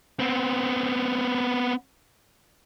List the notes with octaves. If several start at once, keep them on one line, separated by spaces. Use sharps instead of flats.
B3 C4